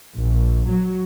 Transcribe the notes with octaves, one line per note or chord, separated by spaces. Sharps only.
A#1
F#3